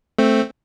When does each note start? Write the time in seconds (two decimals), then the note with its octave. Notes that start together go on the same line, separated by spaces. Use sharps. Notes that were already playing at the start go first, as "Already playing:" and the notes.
0.18 A3 C4